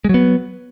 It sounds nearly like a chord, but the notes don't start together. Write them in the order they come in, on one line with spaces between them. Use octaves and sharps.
G#3 F#3 B3